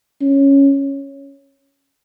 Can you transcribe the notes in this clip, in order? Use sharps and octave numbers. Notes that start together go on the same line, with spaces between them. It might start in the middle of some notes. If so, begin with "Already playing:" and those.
C#4